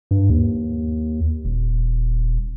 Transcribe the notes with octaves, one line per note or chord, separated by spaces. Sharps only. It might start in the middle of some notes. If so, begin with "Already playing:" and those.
G2
D#2
D#1